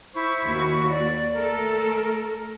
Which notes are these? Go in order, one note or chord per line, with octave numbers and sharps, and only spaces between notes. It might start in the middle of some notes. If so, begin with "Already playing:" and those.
E4 C5 C#6
D#2 F#4
D5
A3 A4 A#4